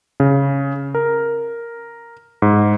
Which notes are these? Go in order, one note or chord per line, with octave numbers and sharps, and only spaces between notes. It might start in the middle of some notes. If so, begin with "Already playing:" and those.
C#3
A#4
G#2